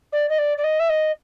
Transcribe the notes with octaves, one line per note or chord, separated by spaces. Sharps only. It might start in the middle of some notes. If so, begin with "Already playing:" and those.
D5
D#5
D5
D5
D#5
E5
D#5